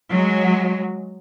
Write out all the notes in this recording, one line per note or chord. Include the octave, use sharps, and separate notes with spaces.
F#3 G#3